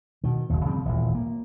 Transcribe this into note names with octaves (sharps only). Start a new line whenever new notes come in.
B2 D#3
F#1 D#2
C#3 F3 G3 C4
D#1 A1
A#3